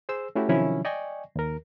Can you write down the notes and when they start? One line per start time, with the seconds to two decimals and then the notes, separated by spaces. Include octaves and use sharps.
0.09 G#4 C5 E6
0.35 A3 C#4 E4 F#4 G4
0.49 C3 D#3 F3 F#3 C#4 E4
0.85 D5 D#5 G5 G#5 C#6
1.36 D#2 A#4